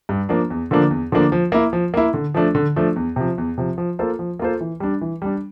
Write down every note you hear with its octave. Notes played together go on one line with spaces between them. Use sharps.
G2
F3 A#3 D4
E2
D3 F3 A#3 D4
E2
D3 F3 A#3 D4
F3
A#3 E4
F3
A#3 E4
D3
F3 A3 D4
D3
F3 A3 D4
E2
C3 F3
E2
C3 F3
F3
A#3 F4 A4 C5
F3
A#3 F4 A4 C5
E3
G3 D4
E3
G3 D4